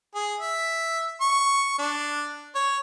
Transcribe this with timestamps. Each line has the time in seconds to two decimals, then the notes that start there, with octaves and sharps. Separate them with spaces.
0.15 G#4
0.40 E5
1.21 C#6
1.79 D4
2.55 C#5